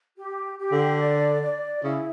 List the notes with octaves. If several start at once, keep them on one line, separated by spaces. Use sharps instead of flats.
G4
G4
D3
D5
D5
C#3 E4